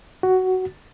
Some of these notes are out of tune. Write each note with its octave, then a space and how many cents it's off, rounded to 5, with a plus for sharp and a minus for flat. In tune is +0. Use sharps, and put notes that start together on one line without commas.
F#4 +10